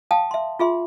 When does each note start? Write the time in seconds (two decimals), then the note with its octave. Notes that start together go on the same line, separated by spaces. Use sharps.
0.11 F5 G5 A5 D#6
0.31 E5 C6
0.59 F4 G#4 E5 C6